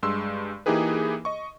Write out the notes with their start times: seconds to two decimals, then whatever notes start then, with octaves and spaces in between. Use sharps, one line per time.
0.03 G2 G#3 C6 E6
0.66 E3 A#3 D#4 G4 G#4 B4
1.25 D#5 C#6